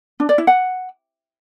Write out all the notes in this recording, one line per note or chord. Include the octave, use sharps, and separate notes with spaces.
D4
D5
E4
F#5